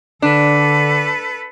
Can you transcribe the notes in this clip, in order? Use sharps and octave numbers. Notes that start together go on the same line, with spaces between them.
D3 D4 A4 B4